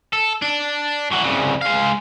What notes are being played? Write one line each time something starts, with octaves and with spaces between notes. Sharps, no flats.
A4
D4
E3 F#4
C2 C#3
G#3 F5